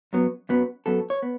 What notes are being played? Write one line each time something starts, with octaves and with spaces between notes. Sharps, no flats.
F#2 F#3 B3
F#2 F#3 B3
F#2 F#3 B3 A4
C#5
B3